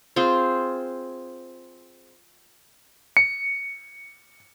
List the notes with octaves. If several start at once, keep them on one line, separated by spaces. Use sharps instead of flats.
C4 F4 G#4 C5
C#7